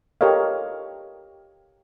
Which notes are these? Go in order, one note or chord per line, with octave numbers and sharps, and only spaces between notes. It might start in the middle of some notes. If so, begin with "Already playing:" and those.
G4 A4 A#4 C#5 D#5 F5